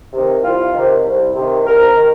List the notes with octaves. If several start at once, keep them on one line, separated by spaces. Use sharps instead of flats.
C3 D#3
C2 F4
C3 D#3
C2
C3 D#3
C2 A#4
D#3